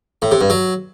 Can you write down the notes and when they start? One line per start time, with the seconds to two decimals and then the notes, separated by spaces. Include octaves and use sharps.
0.22 A2
0.31 C3
0.41 G2
0.50 F#3